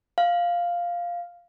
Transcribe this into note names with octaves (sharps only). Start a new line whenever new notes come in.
F5